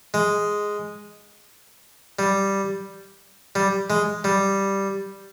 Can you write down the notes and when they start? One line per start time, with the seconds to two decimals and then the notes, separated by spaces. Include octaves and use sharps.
0.14 G#3
2.19 G3
3.55 G3
3.90 G#3
4.24 G3